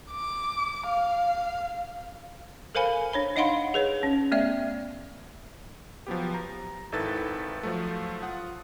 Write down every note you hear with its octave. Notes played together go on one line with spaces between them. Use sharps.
D6
F5
A4 A#4 C5 F5 G#5 B5
D4 C#5 B5
D#4 D#5 F5 F#5 B5 C6
G#4 B4 C#5
C#4
A3 B3 D5 E5
F3 F#3 B3 G4
A#5
G#1 D#3 E4 A4 B4 A6
F3 F#3 A3
F4 F#5 D#6